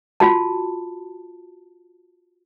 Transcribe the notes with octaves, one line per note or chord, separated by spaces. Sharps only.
F4 F#4 A5